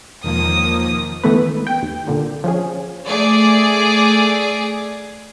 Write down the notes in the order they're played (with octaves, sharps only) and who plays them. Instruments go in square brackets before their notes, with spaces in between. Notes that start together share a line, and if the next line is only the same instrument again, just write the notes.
[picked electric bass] E1 [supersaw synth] D#3 F3 A#3 [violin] D#6
[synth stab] D#3 E3 A3 B3 B4
C#2
G5
D#2
C2 A#2 D3
F3 C#4 G#4
[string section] A3 G#4 D5